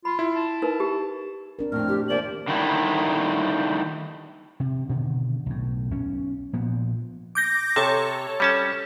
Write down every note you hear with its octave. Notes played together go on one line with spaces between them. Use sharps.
F4 B5
E4
A5
D#4 A#4 B4
G4
C4 D4 A#4
F2 A2 F6
G4
D#2 C5 D5 E5 F#7
D3 D#3 G3 A3 E4
C3
B2 D3 D#3
B1 A2
B1 C#4
A#2 F3 B3
D6 G6 A#6
C3 A4 C#5
G3 C#4 A5